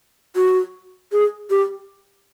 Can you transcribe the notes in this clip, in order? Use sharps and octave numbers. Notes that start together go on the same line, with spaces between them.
F#4
G#4
G4